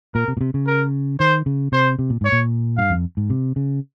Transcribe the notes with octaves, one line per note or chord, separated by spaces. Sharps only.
A#2 A#4
C3
A#2
C3
C#3
A#4
D#3 C5
C#3
C3 C5
C3
A#2
G#2 C#5
A#2
G2 F5
F2
G#2
C3
C#3